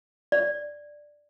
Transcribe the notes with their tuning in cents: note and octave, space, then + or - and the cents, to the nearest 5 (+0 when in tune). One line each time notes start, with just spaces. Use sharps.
D5 +5